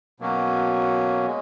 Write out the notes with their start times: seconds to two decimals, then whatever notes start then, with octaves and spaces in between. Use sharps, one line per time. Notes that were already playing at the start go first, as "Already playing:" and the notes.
0.20 B2 F#3 A#3 C#4 F#4
1.26 G#3